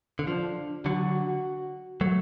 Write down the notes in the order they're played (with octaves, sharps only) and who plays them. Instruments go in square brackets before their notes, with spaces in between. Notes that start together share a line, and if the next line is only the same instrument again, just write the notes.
[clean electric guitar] D3
[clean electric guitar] F3 [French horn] D4
[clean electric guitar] D3 F#3 [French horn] F#4
[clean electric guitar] F#3 A3